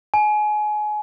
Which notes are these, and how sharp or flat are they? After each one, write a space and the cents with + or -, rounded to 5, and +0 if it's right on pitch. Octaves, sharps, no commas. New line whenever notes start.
G#5 +30